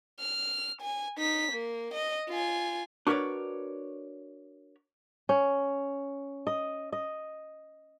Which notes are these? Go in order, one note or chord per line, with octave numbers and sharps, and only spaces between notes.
F6
G#5
D#4 B6
A#3
D#5
F4 G#5
D4 F#4 A#4 B4 C#5 D5
C#4
D#5
D#5